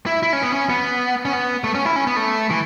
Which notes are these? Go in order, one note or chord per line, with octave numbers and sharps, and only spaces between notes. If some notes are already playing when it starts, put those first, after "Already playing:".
E4
E4
C#4
B3
C#4
B3
C#4
B3
A3
C#4
E4
C#4
B3
A3
E3